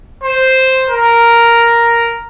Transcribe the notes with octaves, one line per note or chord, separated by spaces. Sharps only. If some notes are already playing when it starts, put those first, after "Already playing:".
C5
A#4